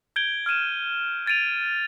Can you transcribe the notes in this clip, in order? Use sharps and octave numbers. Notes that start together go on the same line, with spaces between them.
G6 G#6 D7 G7
F6 G#6 D#7 E7
G#6 A6 D7 D#7 F7